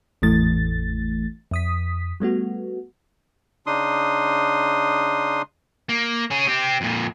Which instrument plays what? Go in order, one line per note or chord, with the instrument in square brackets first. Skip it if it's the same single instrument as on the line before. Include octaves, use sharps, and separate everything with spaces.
[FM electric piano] G#1 E2 A2 E3 A3 A6
F2 D#6 B6
G3 A3 B3 F#4
[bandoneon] C#3 D4 D#4 C6 D#6
[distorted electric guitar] A#3
C#4 G#4
C4 G4
F2 A#2